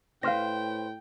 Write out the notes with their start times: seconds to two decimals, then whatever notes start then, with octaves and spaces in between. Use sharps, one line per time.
0.23 A2 B4 C5 F5 G5 F6 A#6